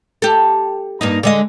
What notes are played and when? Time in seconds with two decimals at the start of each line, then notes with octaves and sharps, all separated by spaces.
0.22 G4 A4
1.01 G2 A#3 D#4
1.23 D3 G#3 D#5